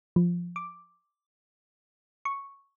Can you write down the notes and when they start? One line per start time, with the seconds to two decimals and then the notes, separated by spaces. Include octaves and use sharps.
0.16 F3
0.56 D6
2.25 C#6